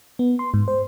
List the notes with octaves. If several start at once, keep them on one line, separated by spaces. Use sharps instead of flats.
B3
C6
G#2
C5